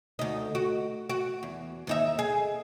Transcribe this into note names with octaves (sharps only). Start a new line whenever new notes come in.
D2 D#4
F#4
F#4
E2
D#2 D#4 E5
G#4